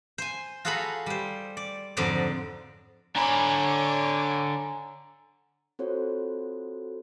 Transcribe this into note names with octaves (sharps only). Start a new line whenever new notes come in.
C5 G#5
F4 F#4 G#4 A4 A#5 B5
G3 C5
D5
F2 G#2 D3 F#3 D5
D3 C#5 G#5 A#5 B5 D6
C4 F4 F#4 A4 C5 C#5